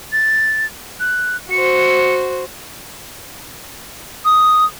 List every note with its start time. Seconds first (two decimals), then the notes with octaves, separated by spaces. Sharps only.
0.12 A6
1.00 F#6
1.51 F#4 C5 C#7
4.25 D#6